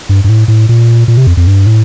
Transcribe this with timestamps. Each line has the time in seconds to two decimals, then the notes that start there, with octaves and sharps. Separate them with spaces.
0.09 G2
0.24 G2
0.29 A2
0.48 A2
0.69 A#2
1.08 A#2
1.17 C3
1.27 F2
1.37 F2
1.47 G2
1.67 A2